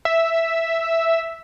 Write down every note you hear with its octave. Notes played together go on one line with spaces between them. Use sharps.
E5